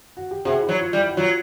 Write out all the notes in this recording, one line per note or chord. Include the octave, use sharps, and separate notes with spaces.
F#4
G4
C3 F#4 G#4
E4
F#3
F4
G3
E4
F#4
F#3 F4